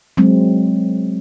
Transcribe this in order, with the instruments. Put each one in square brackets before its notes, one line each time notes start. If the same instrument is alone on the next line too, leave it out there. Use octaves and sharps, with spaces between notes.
[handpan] F#3 G#3 C4